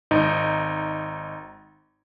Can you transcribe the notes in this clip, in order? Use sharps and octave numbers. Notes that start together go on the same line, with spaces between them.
G#1 D#4